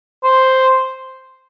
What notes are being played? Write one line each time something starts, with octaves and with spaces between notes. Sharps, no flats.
C5